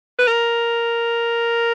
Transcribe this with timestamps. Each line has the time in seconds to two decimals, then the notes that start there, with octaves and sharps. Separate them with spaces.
0.19 B4
0.27 A#4